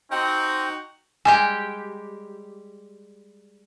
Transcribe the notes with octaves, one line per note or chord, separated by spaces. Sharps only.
C4 D#4 F#4 G5
G3 G#3 G4 G#5